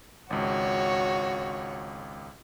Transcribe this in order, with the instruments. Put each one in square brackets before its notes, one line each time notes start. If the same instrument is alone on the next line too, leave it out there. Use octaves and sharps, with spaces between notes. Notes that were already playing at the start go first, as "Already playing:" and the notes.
[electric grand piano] G#1 C#2 [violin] F#4 C#5